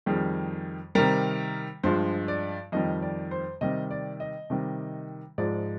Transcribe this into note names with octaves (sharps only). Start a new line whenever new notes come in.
F2 D#3 G3 G#4
C3 D#3 G3 A#4
G2 F3 G#3 C5
D5
F2 D#3 G3 D#5
D5
C5
C3 D#3 G3 D#5
D5
D#5
C3 D#3 G3
G#2 F3 G#3 D5